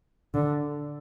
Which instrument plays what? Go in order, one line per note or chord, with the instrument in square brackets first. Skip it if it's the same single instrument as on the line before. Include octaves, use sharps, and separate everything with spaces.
[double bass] D3